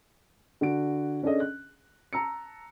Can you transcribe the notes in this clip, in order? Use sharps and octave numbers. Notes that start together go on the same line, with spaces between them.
D3 F#4 D7
C#4 D4 G#4 A4 D#5
F#6
A5 A#5 E6 C#7